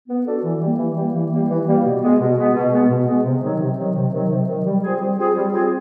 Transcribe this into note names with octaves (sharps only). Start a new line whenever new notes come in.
B3
D4 F#4 A4
E3
G3 A#3
E3
G3 A#3
E3
G3 A#3
E3
G3 A#3
B2
G#3 B3
B2
G#3 B3
B2
G#3 B3
B2
G#3 B3
C3
D#3 F#3
C3
D#3 F#3
C3
D#3 F#3
C3
D#3 F#3
G3
C4 F4 G#4
G3
C4 F4 G#4
G3
C4 F4 G#4